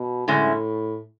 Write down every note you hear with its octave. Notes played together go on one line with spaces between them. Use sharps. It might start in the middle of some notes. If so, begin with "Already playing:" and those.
Already playing: B2
F#2 A2 D3 G#3 C#4 E4